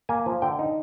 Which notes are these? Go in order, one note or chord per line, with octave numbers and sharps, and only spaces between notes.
A#3 G#5
F3
D3 G5
D#4